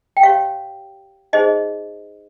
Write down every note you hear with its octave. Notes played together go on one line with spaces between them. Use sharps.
G5
G4 C#5 F5
D#4 G#4 C5 D#5